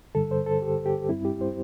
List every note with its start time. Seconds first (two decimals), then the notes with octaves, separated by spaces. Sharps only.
0.15 G2 D3 G3 A4
0.31 C5
0.46 A4
0.62 G4
0.86 G4
1.09 G2 G3 C4 E4
1.25 G4
1.41 C5